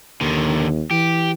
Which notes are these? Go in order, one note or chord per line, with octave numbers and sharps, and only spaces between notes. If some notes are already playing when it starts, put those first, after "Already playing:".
D#2 D3 D#3
E3 G4